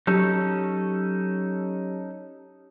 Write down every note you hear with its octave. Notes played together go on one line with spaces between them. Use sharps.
F#3 C#4 D#4 G4 A4